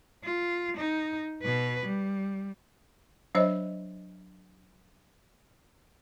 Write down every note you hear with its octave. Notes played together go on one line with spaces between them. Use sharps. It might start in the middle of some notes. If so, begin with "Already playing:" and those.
F4
D#4
B2 B4
G3
F#3 D4 C5 C#5 D#5 E5